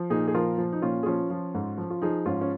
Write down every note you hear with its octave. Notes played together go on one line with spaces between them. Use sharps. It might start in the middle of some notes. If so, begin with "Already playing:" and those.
Already playing: F3
A#2 D#4 G#4
G#4
F3 F4 A#4
F3
D#4
A#2 C#4 F4
G#4
F3 C#4 F4
F3
G#2
F3
F4
F3 D#4 G#4
G#2 C#4 F4
C#4